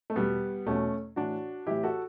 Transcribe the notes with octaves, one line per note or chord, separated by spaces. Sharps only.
A3
E2 B2 G3 B3
E2 B2 A3 C#4
A2 E3 D4 F#4
A2 E3 E4 G4
F#4 A4